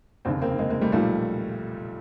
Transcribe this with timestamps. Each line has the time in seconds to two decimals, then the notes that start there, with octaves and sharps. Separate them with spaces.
0.25 F1 D#2 C#3 C4 D4
0.42 A#3 C4
0.59 G#3 A#3
0.70 G#3 A#3
0.81 G3 A3
0.92 B1 A#2 F3 G3 A3